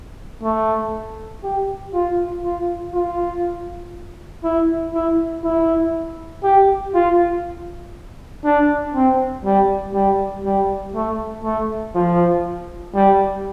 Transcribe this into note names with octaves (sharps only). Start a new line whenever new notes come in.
A3
G4
F4
F4
F4
E4
E4
E4
G4
F4
D4
C4
G3
G3
G3
A3
A3
F3
G3